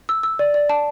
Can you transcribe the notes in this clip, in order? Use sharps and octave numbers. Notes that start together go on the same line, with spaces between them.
E6
E6
D5
D5
A5